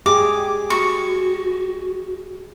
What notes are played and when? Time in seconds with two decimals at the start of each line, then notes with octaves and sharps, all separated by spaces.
0.06 G4 G#4 D6
0.70 F#4 C#6